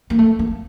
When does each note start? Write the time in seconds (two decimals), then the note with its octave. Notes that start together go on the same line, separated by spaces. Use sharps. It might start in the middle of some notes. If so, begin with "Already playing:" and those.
0.10 A#3
0.19 A3
0.39 A#3